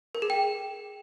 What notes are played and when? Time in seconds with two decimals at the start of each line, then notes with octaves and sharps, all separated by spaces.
0.15 A#4
0.22 G#4
0.30 G5